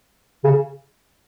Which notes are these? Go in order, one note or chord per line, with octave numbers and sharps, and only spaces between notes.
C#3